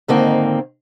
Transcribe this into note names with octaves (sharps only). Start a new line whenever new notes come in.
G#2 D3 D#3 A#3 C4